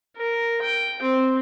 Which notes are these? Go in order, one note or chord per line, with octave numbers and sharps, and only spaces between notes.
A#4
G5
C4